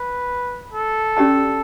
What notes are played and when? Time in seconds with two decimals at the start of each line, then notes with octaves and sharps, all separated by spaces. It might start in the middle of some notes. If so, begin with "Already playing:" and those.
Already playing: B4
0.73 A4
1.17 C#4 G4 D5 A5